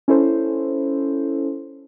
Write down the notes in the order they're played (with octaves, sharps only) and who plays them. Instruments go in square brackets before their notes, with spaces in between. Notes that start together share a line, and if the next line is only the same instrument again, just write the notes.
[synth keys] C#4 E4 A4 C5